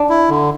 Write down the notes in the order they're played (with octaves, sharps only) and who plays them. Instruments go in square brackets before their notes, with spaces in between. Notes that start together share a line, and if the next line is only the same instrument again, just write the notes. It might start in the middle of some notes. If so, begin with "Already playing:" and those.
Already playing: [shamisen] D4
[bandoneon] E4
D3